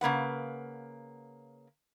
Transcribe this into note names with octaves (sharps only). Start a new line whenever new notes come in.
C#3 A#3 B4 F#5